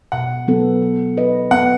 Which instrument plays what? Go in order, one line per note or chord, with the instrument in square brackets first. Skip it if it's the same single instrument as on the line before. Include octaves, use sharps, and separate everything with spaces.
[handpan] B2 [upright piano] F#5
[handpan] F#3 B3 E4 A4
B3
E4 B4 D#5
[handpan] B3 [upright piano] F#5